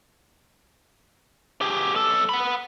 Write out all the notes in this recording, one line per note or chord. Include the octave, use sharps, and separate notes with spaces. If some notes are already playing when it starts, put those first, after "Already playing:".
G4 G#4
B1 A4
F#5 B5